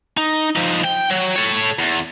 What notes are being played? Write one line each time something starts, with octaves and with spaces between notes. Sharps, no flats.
D#4
F3 D#4
G5
F#3
A4 C#5
E2